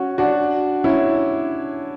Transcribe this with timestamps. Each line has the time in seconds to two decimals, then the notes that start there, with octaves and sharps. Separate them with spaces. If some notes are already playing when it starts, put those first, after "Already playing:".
Already playing: C#4 F#4
0.18 D4 F#4
0.84 C#4 E4